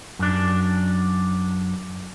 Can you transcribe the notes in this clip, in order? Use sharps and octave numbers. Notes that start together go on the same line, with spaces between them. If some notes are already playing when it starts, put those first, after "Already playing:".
F#2 D4